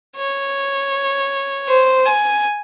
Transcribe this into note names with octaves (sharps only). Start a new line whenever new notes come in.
C#5
C5
G#5